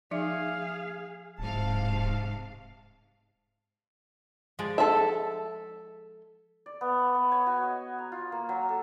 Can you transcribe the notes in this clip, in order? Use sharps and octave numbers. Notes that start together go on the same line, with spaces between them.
F3 D#4 G#4 E5 F5
D1 G#2 C3 F5 A5
F3 G#3 D5
A4 E5
D5
B3
C#6
B3
C#5
F#4
D#5
A#5
F4
A#3
F#3
A4